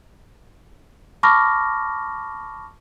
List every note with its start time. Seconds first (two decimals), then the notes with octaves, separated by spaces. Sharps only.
1.23 A5 B5 C#6 D6 F6 A#6